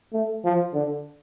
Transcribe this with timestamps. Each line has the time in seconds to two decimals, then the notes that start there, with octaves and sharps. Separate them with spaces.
0.13 A3
0.44 F3
0.74 D3